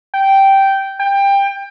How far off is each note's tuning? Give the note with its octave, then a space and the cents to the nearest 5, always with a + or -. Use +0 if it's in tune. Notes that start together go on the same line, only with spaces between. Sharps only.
G5 -10
G5 +20